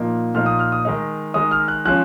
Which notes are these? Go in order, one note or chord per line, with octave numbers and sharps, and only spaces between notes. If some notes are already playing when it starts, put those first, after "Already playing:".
Already playing: A#2 F3 A#3 D#4
A#2 F3 A#3 D#4 F6
D#6
F6
D#6
D#3 G#3 D#4
D#3 G#3 D#4 D#6
F6
F#6
F3 G#3 C#4 F#6